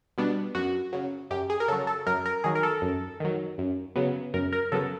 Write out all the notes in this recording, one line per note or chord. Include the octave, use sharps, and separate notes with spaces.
B2 G3 B3 D4
F#2 F#4
C#3 F#3
F#2 G4
G#4
A#4
C#3 F#3 A4
A4
F#2 A#4
A#4
D#3 F#3 G#4
A#4
A4
F#2
D#3 F#3
F#2
C#3 F#3 B3
F#2 A#4
A#4
C#3 F#3 B3 A4